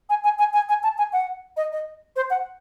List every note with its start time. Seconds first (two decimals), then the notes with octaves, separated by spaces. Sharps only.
0.10 G#5
0.24 G#5
0.39 G#5
0.54 G#5
0.69 G#5
0.83 A5
0.98 G#5
1.13 F#5
1.57 D#5
1.72 D#5
2.16 C5
2.30 F#5